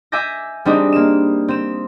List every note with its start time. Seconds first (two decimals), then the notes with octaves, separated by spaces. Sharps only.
0.12 E5 G#5 D6 G6 A#6
0.65 G3 G#3 C4 D4 D#4
0.93 A#3 E7
1.48 C4 E7